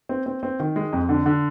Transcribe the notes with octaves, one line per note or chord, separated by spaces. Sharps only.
C4
C4
C4
D#3
G#3
F2
D3
D3